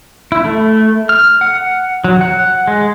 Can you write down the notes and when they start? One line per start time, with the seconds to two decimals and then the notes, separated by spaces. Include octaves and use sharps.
0.32 E4
0.45 A3
1.09 F6
1.41 F#5
2.04 F#3
2.21 F#5
2.68 G#3